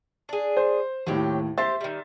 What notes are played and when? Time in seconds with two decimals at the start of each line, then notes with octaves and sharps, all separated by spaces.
0.29 D4 G#4
0.57 C5
1.07 D#2 A2 F#3 C4 G4
1.58 G4 C5 E5 C6 A6
1.81 D#3 G3